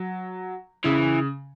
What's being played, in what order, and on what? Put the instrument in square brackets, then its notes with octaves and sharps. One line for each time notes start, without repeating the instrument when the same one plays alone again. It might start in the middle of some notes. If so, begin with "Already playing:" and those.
Already playing: [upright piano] F#3
[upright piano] C#3 [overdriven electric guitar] E3